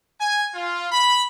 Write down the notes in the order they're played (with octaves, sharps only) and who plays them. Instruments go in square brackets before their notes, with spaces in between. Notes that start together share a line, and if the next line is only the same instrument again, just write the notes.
[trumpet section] G#5
F4
B5